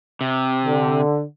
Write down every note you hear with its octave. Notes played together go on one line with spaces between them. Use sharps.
C3
D3